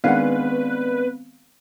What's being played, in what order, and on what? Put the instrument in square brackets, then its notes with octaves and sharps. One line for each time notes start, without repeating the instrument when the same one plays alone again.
[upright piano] D#3 G#3 D4 [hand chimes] B3 C4 [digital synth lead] B4 [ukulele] F5 F#5